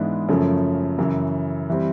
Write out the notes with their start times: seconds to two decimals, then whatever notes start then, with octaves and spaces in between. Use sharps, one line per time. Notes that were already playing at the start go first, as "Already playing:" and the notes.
Already playing: G#2 E3 G#3 B3 D4
0.28 F#2 C#3 F3 A3 C#4
0.98 F#2 C#3 E3
1.70 E3 G3 C4